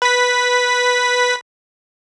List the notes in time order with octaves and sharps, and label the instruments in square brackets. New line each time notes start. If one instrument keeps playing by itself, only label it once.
[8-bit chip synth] B4 B6